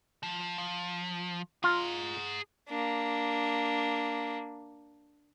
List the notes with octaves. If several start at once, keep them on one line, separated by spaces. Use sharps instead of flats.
F3
F3
F4 G#4 A#5
A#3 D4